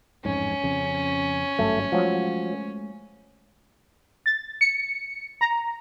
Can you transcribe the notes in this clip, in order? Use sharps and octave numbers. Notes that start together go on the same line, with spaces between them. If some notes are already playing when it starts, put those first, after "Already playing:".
A1 F2 G#2 C#4
F2 C#3
G#1 G2 F#3 A3
F3 F#3 G#3 A3
A6
C#7
A#5